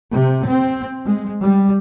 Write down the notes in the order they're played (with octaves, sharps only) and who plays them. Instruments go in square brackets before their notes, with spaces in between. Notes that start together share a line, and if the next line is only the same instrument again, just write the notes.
[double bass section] C3
C4
G#3
G3